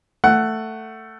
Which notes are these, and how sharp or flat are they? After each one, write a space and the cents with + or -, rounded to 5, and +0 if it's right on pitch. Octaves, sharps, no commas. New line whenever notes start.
A3 +10 F#5 +10